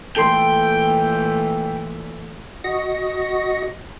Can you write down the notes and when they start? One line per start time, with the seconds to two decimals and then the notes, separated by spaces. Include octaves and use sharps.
0.16 A#2 E3 A3 A4 G5 C6
2.64 F#4 D#5 C#6 A#6